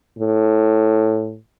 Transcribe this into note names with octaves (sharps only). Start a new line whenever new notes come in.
A2